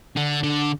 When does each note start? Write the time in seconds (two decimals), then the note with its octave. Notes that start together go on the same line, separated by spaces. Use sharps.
0.16 D3
0.43 D3